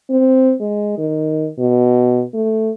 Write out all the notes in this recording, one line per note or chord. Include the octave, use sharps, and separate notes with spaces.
C4
G#3
D#3
B2
A3